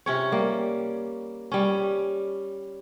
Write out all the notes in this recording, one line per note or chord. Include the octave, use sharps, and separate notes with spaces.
C3 C#4 C#5
G3 A#3
G3 C#4